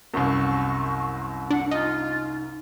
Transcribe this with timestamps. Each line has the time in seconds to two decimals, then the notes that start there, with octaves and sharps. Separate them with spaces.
0.14 C2 F#2 C#6
1.51 D4 F#5
1.71 D#4 F4